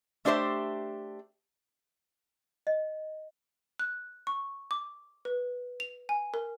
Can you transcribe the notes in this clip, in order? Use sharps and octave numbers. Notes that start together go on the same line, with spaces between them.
A3 D4 G4 C5 E5
D#5
F#6
C#6
D6
B4
F7
G#5
A#4